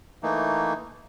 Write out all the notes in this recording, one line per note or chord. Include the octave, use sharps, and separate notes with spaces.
E3 A3 A#3 D#4